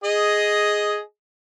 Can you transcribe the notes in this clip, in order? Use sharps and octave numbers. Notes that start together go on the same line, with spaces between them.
G#4 D#5